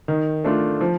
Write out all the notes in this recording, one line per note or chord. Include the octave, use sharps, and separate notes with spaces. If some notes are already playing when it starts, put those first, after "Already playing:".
D#3
A3 D4 F4
F3